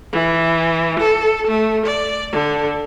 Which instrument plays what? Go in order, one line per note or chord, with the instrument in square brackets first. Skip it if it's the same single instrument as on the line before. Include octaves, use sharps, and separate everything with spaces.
[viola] E3
A4
A3
D5
D3